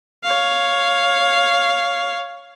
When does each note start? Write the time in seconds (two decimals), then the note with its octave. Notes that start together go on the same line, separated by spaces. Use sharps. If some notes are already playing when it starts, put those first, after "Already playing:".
0.24 C#5 F5